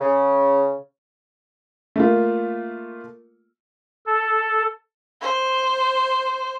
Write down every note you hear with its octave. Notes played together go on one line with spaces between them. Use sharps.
C#3
A3 A#3 F4
A4
C5